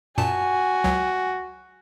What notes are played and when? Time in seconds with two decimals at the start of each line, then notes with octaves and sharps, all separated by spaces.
0.18 F#2 A#2 F#4 G#5 A5
0.84 C#2 F#3